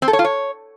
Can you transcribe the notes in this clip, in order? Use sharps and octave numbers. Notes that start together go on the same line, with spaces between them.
C4
A4
C#5
F4
C#5